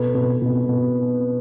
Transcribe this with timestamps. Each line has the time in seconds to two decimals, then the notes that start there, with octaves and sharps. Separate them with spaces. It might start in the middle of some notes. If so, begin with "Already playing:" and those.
Already playing: B2 A4 B4
0.15 B2
0.42 B2
0.69 B2